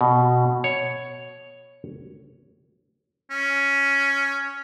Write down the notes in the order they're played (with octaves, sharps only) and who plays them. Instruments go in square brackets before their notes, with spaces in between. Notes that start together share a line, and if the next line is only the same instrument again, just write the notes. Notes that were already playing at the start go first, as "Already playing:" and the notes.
[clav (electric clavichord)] B2
C#5
[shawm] C#4